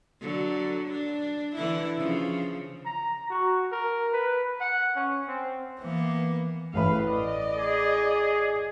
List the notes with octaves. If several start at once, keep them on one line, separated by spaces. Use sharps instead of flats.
D3 F#3
D4
D3 E3 E4
C#3 F3
A#5
F#4
A#4
B4
F#5
C#4
C4
E3 A#3 B3
A1 A2 B4 F5 B5
D5 D#5
G#4